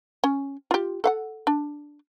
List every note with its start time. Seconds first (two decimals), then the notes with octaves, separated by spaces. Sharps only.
0.24 C#4
0.71 F4 G4
1.04 A4 F5 F#5
1.47 D4